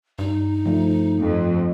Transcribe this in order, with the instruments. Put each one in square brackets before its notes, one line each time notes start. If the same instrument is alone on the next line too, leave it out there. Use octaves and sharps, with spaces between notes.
[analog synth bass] G2 [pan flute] D#4
[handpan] F3 A3
[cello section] F2